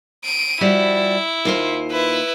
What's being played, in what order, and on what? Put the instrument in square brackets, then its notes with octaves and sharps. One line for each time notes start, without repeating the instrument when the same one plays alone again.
[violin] D7 D#7
[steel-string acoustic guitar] F3 G3 F#4 [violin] E4
[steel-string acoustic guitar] D#2 F4 C5
[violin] E4 B4